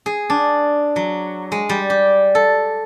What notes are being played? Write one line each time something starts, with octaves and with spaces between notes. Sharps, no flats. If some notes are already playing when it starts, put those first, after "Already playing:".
G#4
D4
F#3
G#3
G3
G4
A4